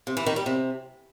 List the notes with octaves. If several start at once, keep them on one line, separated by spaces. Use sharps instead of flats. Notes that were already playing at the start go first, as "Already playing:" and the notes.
C3
E3
D#3
G3
C3